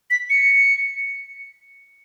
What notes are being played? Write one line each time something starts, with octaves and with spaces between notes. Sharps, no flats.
B6
C#7